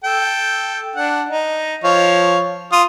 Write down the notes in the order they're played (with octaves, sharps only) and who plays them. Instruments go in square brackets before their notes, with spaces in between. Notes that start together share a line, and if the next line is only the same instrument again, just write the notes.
[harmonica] A4 G5
D4 F#5
D#4
F3 C#5 F5
F4 D#6